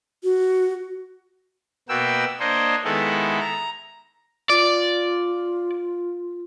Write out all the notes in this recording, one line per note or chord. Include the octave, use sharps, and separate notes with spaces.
F#4
B2 A#3 B3 F#4 G5 E6
A#3 D4 C5 C#5 D#5
D#3 G#3 B3 E4 A4
A#5
F4 D5